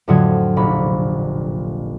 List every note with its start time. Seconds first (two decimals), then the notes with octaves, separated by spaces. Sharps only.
0.08 F2 A2 D3 F#3 D#6 G#6
0.56 F1 A#1 B5